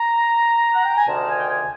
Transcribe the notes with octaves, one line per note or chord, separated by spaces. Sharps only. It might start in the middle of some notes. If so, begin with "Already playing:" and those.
Already playing: A#5
F#5
G5
G#5
D2 C3 D#3 A5
G#5
G5
G#5